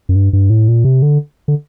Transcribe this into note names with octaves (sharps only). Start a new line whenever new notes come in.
F#2
G2
G2
A2
A#2
C3
D3
D3